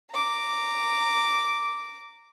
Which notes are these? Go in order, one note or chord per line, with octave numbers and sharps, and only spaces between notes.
A#5 D6